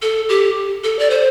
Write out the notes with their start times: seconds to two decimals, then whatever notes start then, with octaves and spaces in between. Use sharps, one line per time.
0.02 A4
0.29 G4
0.84 A4
0.99 D5
1.10 C5